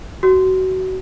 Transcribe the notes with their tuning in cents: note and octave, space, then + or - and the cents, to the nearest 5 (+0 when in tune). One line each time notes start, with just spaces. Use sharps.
F#4 +20